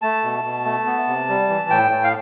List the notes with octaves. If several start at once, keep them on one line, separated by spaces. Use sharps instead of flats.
A3 A5
B2
B2
A3
B3
C3
G3
E3
A2 G5
A2
F5